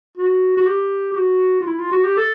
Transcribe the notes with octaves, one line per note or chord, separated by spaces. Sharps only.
F#4
F#4
G4
G4
F#4
F4
E4
F4
F#4
G4
A4